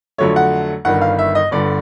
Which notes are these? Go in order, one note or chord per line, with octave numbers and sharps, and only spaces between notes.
F2 D3 F#3 A3 C#5
F#5
G1 G2 D#3 F#5
F5
E5
D#5
G1 G2 D3 D5